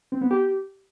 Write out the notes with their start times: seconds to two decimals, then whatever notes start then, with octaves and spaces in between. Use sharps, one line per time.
0.12 C4
0.21 B3
0.31 G4